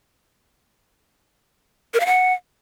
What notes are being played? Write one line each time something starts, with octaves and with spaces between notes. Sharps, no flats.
A#4
F5
F#5